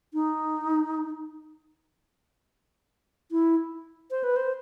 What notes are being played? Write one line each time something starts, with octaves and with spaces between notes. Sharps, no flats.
D#4
E4
C5
B4
C5